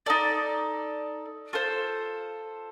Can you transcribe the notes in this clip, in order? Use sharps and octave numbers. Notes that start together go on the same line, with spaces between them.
D#4 A4 D5
F4 A4 C5